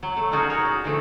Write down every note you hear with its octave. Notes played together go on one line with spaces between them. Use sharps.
F#3
A3
C#4 D#4 F4 F#4 G#4
D#4 G#4 A#4 C#5
A#2 F#4
D3 E3 F3 A3